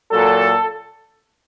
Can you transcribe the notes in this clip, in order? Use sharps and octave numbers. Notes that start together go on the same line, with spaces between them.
A#2 F#3 A4